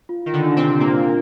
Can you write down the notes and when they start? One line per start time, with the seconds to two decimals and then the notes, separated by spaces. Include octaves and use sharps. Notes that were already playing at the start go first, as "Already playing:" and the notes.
0.09 F4
0.26 D#3
0.33 D3
0.45 D4
0.57 C3 C4
0.79 A#2 A#3 F4